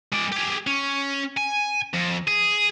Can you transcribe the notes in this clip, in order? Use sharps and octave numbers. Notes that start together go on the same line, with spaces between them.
G#3 D5
G4 G#4
C#4
G#5
F2
G#4